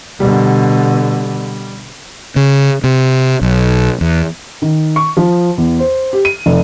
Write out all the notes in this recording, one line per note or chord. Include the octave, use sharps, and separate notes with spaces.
B2 D3 G3
C#3
C3
B1
E2
D#3
C#6
F3
E2
C5
G4
D#7
F1